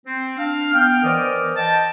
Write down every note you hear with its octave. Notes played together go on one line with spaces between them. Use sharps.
C4
D4 F5
B3 G5 F6
E3 A#4 C5 D5 D#5 F6
D#5 G5 A5